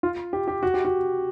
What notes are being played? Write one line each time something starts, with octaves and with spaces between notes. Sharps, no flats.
F4
G4
G4
F#4
G4
F#4